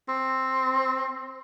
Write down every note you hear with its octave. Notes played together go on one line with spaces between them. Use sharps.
C4